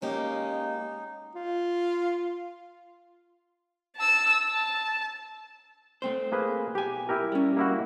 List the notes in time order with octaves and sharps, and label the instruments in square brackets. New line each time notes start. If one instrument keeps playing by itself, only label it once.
[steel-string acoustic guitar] G#3 A#3 G4 [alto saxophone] C#4 [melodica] D#4
[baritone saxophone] F4
[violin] A5 E6
A5
[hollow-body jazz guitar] A3 C4 C5
[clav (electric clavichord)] A#3 G#4 B4
[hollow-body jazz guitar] B1 G#5 [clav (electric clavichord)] G4
[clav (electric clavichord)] E4 G4 A#4
[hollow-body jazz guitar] G3 C#4
[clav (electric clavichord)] A#3 E4 F#4